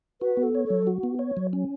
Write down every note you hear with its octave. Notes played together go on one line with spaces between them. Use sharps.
F#4 B4
B3
A4
C#5
A4
F#3
F#4
B3
C#5
F#3
C#4